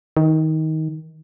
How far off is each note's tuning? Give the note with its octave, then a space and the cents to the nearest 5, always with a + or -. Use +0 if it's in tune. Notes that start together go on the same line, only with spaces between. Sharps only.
D#3 +20